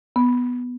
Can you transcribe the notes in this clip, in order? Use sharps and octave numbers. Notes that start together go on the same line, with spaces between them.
B3